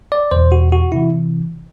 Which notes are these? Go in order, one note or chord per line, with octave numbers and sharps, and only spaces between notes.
D5
E2 B2 C5
F#4
F#4
C3 E3 E4